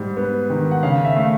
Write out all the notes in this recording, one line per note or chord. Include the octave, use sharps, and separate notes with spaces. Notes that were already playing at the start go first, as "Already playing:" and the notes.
Already playing: G#2 G3
B3
D#3
F#5
C#3 F5
E5
A3 F5